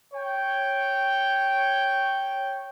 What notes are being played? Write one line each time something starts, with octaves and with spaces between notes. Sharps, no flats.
C#5 G5